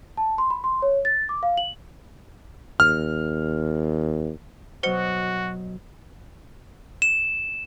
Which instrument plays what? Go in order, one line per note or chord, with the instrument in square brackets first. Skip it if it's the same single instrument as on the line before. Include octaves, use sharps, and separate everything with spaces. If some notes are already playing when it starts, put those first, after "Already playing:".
[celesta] A5
C6
B5
C6
C#5
A6
D6
F5
F#7
[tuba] D#2 [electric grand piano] F6
[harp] B2 F#3 D#5 [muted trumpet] F#4 [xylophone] C5 C#7
[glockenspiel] E7